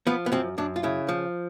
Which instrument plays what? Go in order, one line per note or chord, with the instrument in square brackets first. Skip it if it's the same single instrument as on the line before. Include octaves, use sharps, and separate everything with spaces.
[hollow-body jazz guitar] F3 B3
B3
F#2 C4
F#2 D4
F4
C#3 E4
F3